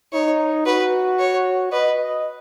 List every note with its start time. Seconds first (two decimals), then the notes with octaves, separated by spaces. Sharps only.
0.13 D#4 C#5
0.66 F#4 B4
1.19 C#5
1.72 B4 D#5